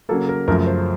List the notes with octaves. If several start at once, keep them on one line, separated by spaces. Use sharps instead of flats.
C#3 F#3 A#3 A4
A#4
F#2 C#3 F3 A3 A#4
C5